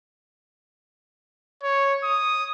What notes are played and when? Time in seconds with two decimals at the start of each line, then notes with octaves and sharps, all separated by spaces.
1.63 C#5
2.03 D#6